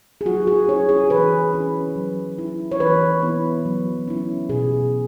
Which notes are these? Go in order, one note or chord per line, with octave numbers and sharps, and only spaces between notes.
G#4
F#3 F#4
G#4
C#4 E4 C#5
G#4
E3 B4
C#4 E4
F#3
E4
C#5
E3 B4
B3 E4
F#3
C#4 E4
B2 G#4